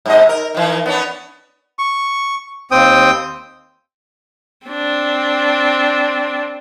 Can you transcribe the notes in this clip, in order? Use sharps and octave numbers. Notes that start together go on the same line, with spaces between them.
G#2 C3 D#5
A#4
D#3 E3
B3 C#4 D4
C#6
D#2 C4 G5 D#6
C4 D4